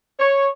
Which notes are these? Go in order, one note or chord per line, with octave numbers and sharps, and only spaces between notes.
C#5